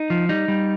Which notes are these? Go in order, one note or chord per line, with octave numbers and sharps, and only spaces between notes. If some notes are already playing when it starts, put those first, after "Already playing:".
Already playing: D#4
F3
G3 D#4
G3